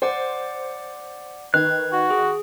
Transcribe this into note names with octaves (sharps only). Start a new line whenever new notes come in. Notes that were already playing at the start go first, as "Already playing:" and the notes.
C5 D5 F#5 D6
D#3 B4 F#6 G#6
F#4
G#4